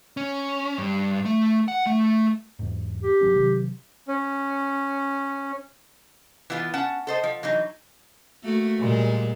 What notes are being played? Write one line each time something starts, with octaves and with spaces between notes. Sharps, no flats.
C#4
G2
A3
F#5
A3
E2 G#2
G4
G1 F#3 C#4
C3 D#3 F#3
C#4
E3 B3 E4 F4 B4
C#4 F#5 A5
A4 C5 D#5
F3
E3 F#3 D#4
A3 A#3 F#4
A#2 G3 G#3